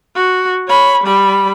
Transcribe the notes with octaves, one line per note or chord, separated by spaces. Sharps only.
F#4
C#5 B5
G3 B5